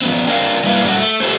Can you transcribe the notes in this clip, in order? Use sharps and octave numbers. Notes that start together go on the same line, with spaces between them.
F3 B3 C4
C4 D4 A#4 D#5 F5
G3 A#3 E4 B4 D5 F5
G2 F#3 A3 F#4
A3
A3 G4 A4 C5